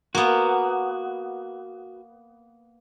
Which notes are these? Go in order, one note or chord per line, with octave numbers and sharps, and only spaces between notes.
A#3 B3 F#4